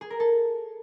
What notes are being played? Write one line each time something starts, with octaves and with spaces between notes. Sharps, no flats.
G#4
A#4
A4